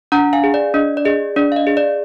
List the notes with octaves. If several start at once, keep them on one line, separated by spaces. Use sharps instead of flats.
D4 F#5 A#5
F5 G#5
G#4
D5
D4 D#5
D5
G#4 D#5
D4 D5
F5
D#5
G#4
D5